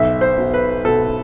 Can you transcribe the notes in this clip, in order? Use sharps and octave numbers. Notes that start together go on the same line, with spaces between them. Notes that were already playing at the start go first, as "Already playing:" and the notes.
Already playing: B1 E5
C5
B2
B4
B2 A4